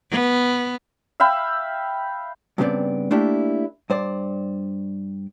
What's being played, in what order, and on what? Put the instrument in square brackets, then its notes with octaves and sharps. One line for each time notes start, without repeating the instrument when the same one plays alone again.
[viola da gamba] B3
[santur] E5 F5 G5 B5
[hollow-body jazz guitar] G2 C#3 F3 B3 C4 D5
A3 A#3 D4 E4 G4
G2 C5 D5